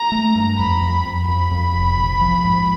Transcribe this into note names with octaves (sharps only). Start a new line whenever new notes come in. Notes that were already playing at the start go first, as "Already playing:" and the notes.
Already playing: A#5
A3
G2
F2 B5
F2
F2
F2 B5
F2
F1
A#1
F3
G#2